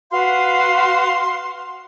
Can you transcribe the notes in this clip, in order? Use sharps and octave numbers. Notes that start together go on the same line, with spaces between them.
F#4 B4 F5 C6